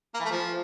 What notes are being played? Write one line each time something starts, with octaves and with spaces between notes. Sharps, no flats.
A#3
E3
A3
F3